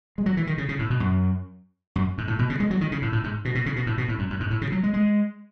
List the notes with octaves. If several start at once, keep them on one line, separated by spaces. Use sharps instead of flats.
G#3
F#3
E3
D#3
C#3
C#3
A2
B2
F#2
F#2
G#2
A2
B2
C#3
G#3
F#3
D#3
C#3
A2
A2
G#2
B2
B2
C#3
B2
A2
B2
A2
F#2
F#2
G#2
A2
C#3
F#3
G#3
G#3